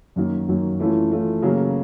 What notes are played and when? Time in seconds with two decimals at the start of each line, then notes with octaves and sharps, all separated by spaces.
0.16 F#2 D#3 F#3 A#3
0.48 F#2 D#3 F#3 A#3
0.80 E3 A3 C#4 F4
1.11 E3 A3 C#4 F4
1.42 C#3 F#3 A#3